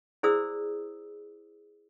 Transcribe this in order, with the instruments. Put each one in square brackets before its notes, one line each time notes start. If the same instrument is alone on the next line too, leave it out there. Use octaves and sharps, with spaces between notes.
[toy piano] E4 G#4 C5 D5 D#6 E6